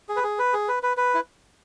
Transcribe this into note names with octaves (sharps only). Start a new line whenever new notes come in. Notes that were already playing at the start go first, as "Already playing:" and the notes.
G#4
B4
G#4
B4
G#4
B4
B4
B4
E4